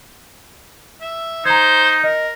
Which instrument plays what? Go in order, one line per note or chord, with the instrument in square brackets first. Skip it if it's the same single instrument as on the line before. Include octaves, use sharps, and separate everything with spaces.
[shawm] E5
[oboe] D#4 [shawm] C5 [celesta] A#5 G#6
[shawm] A#4 [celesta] D#5